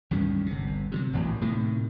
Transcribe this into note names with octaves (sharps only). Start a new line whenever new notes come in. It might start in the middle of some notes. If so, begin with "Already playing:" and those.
C#2 G2 D#3 C#4
G1 C3
G1
C3 F3 F#3
E1 A1 D#2
A2 C3 D#3